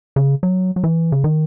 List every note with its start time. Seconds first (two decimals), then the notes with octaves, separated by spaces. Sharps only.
0.16 C#3
0.43 F#3
0.76 F#3
0.84 E3
1.12 C#3
1.24 D#3